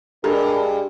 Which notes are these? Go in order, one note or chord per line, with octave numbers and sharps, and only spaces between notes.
G2 G#3 D4 G4 A4 A#4 A#5